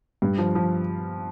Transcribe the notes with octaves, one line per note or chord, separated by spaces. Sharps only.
G2
F3
F3